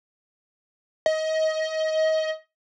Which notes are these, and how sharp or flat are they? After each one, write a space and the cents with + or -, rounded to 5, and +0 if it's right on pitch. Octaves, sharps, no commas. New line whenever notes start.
D#5 +25